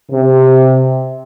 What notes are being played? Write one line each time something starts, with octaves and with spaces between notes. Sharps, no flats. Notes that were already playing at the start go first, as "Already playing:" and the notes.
C3